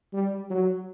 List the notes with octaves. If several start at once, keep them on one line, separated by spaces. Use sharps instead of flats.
G3
F#3